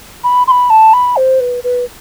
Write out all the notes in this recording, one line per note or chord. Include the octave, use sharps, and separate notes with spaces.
B5
C6
B5
A5
B5
C5
B4
B4